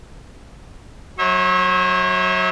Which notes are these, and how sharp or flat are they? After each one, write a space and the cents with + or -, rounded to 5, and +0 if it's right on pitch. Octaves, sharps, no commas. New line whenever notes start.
F#3 +0 C#5 -45 E5 -35